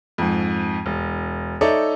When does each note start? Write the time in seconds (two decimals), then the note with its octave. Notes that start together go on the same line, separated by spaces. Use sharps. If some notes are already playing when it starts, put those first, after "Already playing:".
0.18 F2 G#2
0.86 E1
1.61 D#4 A4 C#5 D5 E5